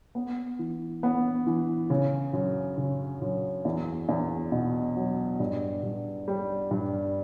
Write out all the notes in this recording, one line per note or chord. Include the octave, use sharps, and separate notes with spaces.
B3
E3
B3
E3
C#3
F#2
C#3
F#2
E2
E2
B2
F#3
G2
G2
G3
G2